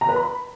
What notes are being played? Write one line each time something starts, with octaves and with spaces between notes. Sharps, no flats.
A#5
B4
B5